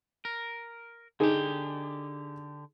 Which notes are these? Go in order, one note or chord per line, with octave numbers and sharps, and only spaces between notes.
A#4
D3 D#4 G4 G#4